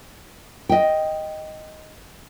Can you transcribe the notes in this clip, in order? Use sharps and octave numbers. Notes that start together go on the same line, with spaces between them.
D#5 G5